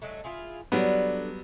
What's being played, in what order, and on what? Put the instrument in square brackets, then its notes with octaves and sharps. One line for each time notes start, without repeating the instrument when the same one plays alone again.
[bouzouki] F#3 G#3 A3
E4 F4 G#4
[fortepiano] F#3 G3 B3 [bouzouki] D4 A4 B4